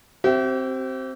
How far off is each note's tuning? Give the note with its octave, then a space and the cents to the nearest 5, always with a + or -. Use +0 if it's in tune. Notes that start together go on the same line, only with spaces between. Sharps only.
C4 +5 G4 -40 E5 +10